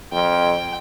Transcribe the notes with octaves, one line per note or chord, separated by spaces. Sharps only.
F2 G5